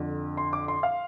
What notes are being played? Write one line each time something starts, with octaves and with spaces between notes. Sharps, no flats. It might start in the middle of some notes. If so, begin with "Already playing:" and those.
Already playing: F2 D3
C6
D6
C6
F5